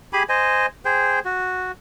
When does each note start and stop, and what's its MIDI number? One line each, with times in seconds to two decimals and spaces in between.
0.13 0.23 67
0.13 0.23 68
0.13 0.23 80
0.13 0.23 83
0.29 0.66 72
0.29 0.66 75
0.29 0.66 80
0.85 1.19 68
0.85 1.19 72
0.85 1.19 79
1.25 1.72 66